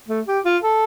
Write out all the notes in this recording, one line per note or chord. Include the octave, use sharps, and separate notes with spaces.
A3
G4
F4
A4